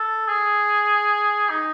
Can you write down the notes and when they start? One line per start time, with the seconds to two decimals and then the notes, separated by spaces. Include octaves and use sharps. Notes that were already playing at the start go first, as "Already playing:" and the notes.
Already playing: A4
0.28 G#4
1.50 D#4